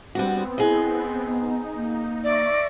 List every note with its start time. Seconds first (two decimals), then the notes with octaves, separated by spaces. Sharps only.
0.15 G3 B3 C4 D4 F#4
0.58 E4 G#4 D#5
1.26 B3 D#4
1.75 A#3
2.24 D5 E5 C#6 A#6